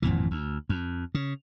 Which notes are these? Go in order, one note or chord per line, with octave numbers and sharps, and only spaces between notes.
G#1 F2 A#2 E3
D2
F2
C#3